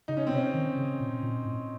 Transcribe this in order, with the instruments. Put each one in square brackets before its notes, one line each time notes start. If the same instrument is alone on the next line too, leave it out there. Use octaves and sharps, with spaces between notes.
[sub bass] C#3 [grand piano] D#4
[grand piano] C#4
C4
[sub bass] C3
[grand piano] C#4
[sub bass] D#3
C#3
A#2
A#2
A2